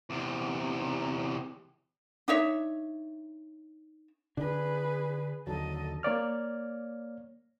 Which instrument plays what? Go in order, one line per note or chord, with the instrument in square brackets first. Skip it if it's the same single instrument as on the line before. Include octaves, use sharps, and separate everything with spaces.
[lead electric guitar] E2 C3
[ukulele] D4 D#4 C#5 E5
[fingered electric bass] D3 D4 [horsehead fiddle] G#4 B4
[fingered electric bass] D#2 D3 F#3 [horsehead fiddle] A4 D#5
[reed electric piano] A#3 C#5 D5 F6